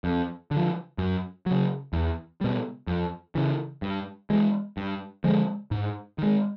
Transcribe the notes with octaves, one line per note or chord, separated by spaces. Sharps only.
F2
D3
F3
F#2
C#3 F#3
E2
B2 G3
F2
C#3 E3
G2
E3 G#3
G2
D3 F3 G#3
G#2
D#3 G#3